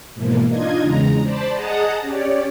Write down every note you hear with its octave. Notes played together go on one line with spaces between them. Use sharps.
G#2 B2 E3 F3 A#3
D4 D#4 F4 D#5 G#6
E2 C#3 G#3 A#5
C5 D5 A5 B5
G#4 D#5 F#5 A5 A#5 D#6
C#4 G4 C#5 D5